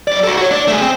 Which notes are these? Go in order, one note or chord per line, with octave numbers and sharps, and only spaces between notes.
F#3 D5
F#4 A4
F#4 C#5
D4 D5
A3 G#4
C4